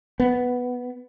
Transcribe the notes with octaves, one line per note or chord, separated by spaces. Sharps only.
B3